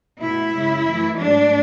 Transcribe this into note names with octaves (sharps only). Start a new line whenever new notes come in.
B2 A3 E4
F#2 C#3 G#3
F#2 E3 A3
G#2 F#3 A3 D4